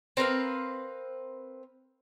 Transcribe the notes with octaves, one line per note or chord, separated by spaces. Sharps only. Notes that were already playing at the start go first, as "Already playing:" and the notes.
C4 A#4 B4 F5